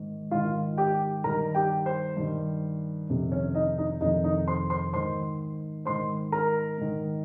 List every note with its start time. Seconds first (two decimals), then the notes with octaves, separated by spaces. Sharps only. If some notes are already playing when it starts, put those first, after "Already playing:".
Already playing: G#2 D#3
0.31 G#2 D#3 F4 F5
0.77 G4 G5
1.24 G2 D#3 A#4 A#5
1.55 G4 G5
1.86 C5
2.17 G2 D#3
3.09 F2 C3 D#3
3.31 C#4 C#5
3.55 D#4 D#5
3.78 D#4 D#5
4.01 F2 C3 D#3 D#4 D#5
4.24 D#4 D#5
4.48 C5 C6
4.70 C5 C6
4.93 G#2 D#3 C5 C6
5.85 G#2 D#3 C5 C6
6.32 A#4 A#5
6.78 G#2 D#3